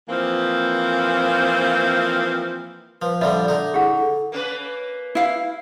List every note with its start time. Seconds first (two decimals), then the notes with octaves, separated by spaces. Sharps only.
0.09 E3 F3 A#3 C4
3.02 F3 B4
3.21 D3 F3 G3 D5 E5
3.48 D3 D#4
3.74 E4 G#4 F#5
3.95 A4
4.32 A#3 C#4 B4
5.15 E4 F5